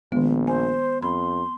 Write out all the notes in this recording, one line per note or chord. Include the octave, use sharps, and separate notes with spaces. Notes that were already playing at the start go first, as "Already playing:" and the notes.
A#1 D#3 G#3 B3
C5 G#5
F2 B5 C6